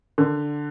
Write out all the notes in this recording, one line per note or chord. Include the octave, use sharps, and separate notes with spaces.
D3